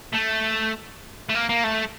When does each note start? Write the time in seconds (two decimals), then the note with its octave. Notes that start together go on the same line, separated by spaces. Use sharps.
0.13 A3
1.29 A3
1.35 A#3
1.49 A#3
1.64 A3